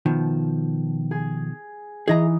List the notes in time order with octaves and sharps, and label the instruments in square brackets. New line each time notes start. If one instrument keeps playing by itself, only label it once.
[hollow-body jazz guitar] B2 D#3 F3
[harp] G#4
[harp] E3 D#4 [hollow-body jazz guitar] G#4 D#5 A#5